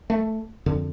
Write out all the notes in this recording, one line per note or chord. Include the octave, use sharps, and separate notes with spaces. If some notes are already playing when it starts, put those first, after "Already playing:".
A3
F2 D3